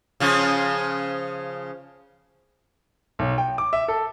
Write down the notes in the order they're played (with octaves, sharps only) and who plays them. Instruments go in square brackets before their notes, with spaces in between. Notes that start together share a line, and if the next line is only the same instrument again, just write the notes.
[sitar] C#3 F3 C#4
[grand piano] B1
G5
D6
E5
A4